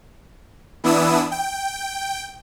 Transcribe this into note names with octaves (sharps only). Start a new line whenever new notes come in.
E3 B3 D4 E4 D#6 E6
G5